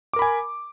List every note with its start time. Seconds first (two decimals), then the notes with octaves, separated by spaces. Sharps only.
0.13 D6
0.16 A#4
0.19 B5
0.22 G#5